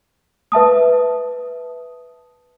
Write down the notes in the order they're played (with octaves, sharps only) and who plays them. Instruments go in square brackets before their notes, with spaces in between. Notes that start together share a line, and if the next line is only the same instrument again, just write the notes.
[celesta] B4 E5 A5 D#6